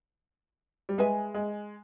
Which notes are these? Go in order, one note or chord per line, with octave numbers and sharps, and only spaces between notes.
G3
G#3 G#4 B4 E5 G#5
G#3